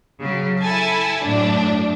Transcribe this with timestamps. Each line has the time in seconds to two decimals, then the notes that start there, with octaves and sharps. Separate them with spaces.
0.21 C#3 F#3
0.62 E4 A4 G#5 A5
1.24 F#2 A2 D4